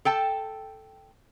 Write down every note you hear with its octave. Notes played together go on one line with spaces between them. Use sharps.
A4 G5 A5